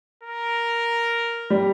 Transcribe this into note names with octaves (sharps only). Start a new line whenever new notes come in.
A#4
G3